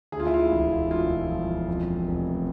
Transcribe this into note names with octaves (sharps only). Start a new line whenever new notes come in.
D2 G#4
F4
E4
F4
E1
E1 F4
F3
F2
F1